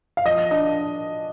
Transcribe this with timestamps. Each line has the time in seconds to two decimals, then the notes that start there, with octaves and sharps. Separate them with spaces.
0.17 F5
0.26 F3 D#5
0.51 D4 D#5